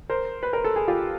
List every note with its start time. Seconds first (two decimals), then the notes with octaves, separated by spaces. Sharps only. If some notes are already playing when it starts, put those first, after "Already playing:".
0.09 A#4 C5
0.43 B4
0.53 A#4
0.64 A4
0.76 G#4
0.88 F4 G4